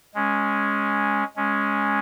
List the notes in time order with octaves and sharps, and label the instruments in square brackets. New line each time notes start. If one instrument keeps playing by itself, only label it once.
[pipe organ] G#3 C#4
G#3 C#4